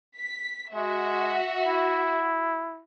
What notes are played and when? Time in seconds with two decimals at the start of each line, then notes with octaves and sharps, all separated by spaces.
0.18 B6
0.75 G#3 F#4 E5
1.66 E4